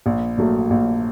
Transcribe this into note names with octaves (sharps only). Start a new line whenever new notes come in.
A#1
A#2 F#3 A3
A#1